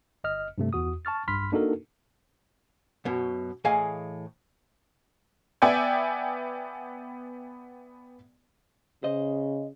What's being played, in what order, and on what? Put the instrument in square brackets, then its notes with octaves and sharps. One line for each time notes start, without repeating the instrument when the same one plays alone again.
[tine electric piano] G1 D#5 F6
G2 C3 A3
E2 F#4 D#6
A5 C#6 F6 A6
A#1 G2 B5 C6 F6 B6
A#3 D4 D#4 F#4 A4 A#4
[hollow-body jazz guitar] F#2 B2
A2 E3 G#4 D#5 F5 G#5
[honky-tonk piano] B3 D5 E5 G5 G#5
[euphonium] C#3 [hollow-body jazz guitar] C5 D#5